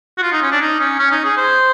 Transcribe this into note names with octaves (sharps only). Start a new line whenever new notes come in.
F#4
F4
D#4
C#4
D4
D#4
C#4
C#4
D#4
G#4
C5